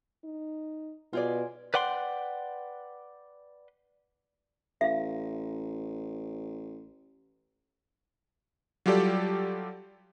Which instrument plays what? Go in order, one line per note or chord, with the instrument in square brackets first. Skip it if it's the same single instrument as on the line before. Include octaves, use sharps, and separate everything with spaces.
[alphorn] D#4
[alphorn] B2 [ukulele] F4 G#4 D5
[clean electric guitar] B4 D5 F#5 G5 C6
[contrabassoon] A1 [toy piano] E5 F5
[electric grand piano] F#3 G3 F4 G4 A4 D5